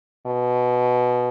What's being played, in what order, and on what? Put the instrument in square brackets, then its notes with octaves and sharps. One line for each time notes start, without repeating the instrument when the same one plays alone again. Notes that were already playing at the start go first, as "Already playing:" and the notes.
[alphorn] B2